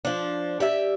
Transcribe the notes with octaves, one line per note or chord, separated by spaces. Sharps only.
F3 D4
G4 D5 E5